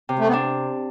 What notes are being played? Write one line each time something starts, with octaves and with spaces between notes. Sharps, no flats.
C3
A3
B3
D4